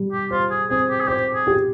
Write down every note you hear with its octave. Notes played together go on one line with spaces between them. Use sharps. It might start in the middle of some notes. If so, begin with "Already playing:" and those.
Already playing: G3
G4
F4 C5
G#4
C4 G#4
G4
G#4
G4 C5
G#4
G4